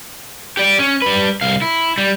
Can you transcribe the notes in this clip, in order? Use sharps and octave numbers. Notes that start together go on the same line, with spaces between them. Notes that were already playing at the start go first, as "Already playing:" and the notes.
G4 D5
C#4
G3 B4
C2 F5
E4
G3